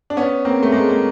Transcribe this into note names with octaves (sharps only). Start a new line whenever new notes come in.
D4
B3 C#4
A#3 C4
A3
G#3 A#3
A#3